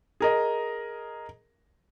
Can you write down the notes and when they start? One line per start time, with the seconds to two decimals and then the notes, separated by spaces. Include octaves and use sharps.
0.20 G#4 A#4 D#5